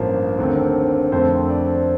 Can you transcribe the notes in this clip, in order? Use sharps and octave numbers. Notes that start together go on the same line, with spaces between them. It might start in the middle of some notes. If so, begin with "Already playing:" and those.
Already playing: A1 G2 F3 A#3
D#2 D3 A3 C4
F2 D3 F3 A3 C4 C5
D5